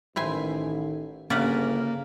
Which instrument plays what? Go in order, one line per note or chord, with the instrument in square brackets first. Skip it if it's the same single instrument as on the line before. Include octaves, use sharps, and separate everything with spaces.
[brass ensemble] A1 D#3 [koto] E4 C5 G#5
[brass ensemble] G1 [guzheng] C#3 [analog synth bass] A#3 [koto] D5 E5 F#5